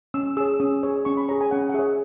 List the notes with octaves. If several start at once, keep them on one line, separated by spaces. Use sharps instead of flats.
C#4 E6
G#4 C#5 E6
C#4 D#6
G#4 C#5
C#4 C#6
B5
G#4 C#5 A#5
G#5
C#4 F#5
F#5
G#4 C#5 E5